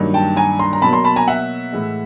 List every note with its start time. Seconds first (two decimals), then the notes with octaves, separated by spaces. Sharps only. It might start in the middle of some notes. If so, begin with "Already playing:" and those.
Already playing: G2 D#3 F#3 A#3
0.14 G5 A5
0.37 G#5 A#5
0.59 A#5 C6
0.73 A#5
0.82 B2 F#3 A#3 A5 B5
0.93 A#5 C6
1.04 A5 B5
1.16 G#5 A#5
1.28 E5 F#5
1.73 A2 E3 G#3